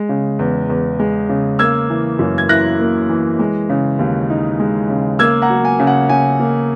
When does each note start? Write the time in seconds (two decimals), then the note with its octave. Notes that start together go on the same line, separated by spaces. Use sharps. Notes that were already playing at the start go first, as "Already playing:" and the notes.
Already playing: G#3
0.09 C#3
0.39 E2
0.69 E2
0.99 G#3
1.29 C#3
1.59 A#3 E6 G#6
1.90 E3
2.19 F#2
2.38 G#6
2.49 E4 F#6 A#6
2.80 A#3
3.09 E3
3.39 G#3
3.69 C#3
3.99 D#2
4.30 D#4
4.60 G#3
4.90 C#3
5.19 A#3 E6 G#6
5.42 F#5 A#5
5.50 F#3
5.65 G#5
5.79 C#3
5.87 F#5
6.09 C#3 G#5
6.40 A#3